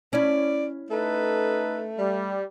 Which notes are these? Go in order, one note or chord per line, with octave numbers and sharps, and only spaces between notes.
C#4 E4 D5
A3 D#4 A4 B4
G3